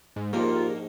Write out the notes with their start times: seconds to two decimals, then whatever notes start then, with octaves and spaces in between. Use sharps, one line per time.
0.16 G#2
0.33 A#1 D#2 G#2 A#3 F4 G4 A#4